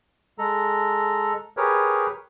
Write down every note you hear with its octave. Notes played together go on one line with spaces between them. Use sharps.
G#3 A4 A#5
G4 G#4 A#4 B4 C#5